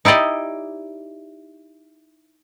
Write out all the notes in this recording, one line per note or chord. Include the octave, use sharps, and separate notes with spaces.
D#4 E4 G4 D5 D#5